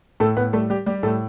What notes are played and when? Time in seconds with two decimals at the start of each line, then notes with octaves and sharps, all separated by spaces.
0.20 A2 A3 A4
0.37 A2 B3 B4
0.53 G3 A3 A4
0.70 G3 G4
0.86 G3 G4
1.03 A2 A3 A4